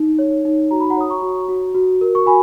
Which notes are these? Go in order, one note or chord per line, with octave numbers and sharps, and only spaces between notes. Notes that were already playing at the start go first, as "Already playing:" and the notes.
Already playing: D#4
C#5
D#4
F#4 A#5
B5
F#5 A#5
C#5 D#6
A#5 C#6
F#4
F#4
F#4
A#4
C#6
F#4 G#5 B5